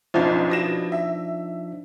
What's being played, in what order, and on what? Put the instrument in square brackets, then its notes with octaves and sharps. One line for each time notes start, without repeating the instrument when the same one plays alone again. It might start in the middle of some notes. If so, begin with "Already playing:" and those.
[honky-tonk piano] F#1 B1 [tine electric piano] F3 D4 D#4
[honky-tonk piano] B2 A#6 E7
E5